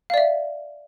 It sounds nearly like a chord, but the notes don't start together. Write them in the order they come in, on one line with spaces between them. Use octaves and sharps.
F5 D5 E5